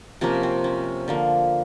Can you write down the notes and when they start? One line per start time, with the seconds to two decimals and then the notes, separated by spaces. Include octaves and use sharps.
0.21 C3 F3 A#3 C#4
0.43 C4
0.64 C#4
1.08 D3 F3 A#3